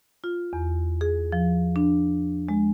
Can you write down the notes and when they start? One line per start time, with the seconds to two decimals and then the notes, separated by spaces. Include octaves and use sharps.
0.24 F4
0.53 E2
1.01 G#4
1.32 F3
1.76 D4
2.49 G#3